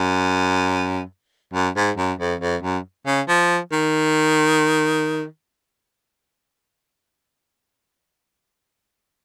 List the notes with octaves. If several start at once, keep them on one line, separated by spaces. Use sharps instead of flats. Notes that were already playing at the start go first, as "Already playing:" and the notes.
Already playing: F#2
F#2
G#2
F#2
F2
F2
F#2
C#3
F3
D#3